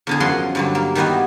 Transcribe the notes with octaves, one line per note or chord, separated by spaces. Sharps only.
E2 D3 G#4
F#2 F3 C#4 D#5 F#5 C6
G2 D3 F#3
A#3
D#3 G3 B3 E4 F#4 D#5